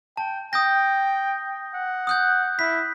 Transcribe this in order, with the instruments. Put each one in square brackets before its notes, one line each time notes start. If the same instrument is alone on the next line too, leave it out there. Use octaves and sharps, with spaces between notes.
[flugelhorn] G5 [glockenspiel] A5
[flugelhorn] G5 [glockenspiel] D#6 G6 A#6
[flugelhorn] F#5
[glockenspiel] D#6 F#6 G6
[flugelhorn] E4 [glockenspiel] B6